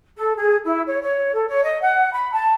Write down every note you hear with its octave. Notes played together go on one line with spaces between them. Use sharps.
A4
G#4
E4
C#5
C#5
A4
C#5
D#5
F#5
B5
A5